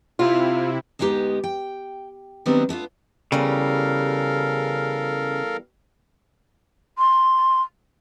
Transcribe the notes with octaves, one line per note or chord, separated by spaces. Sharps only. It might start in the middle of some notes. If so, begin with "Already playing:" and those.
C3 E4 F4
D2 G#3 B3 D#4 G4
G5
D#3 F#3 G3 B3 C4 D4
A3 B3 D4 F4
E2 C#3 G3 A4 A#4 F5
C6